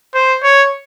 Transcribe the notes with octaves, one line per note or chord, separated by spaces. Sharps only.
C5
C#5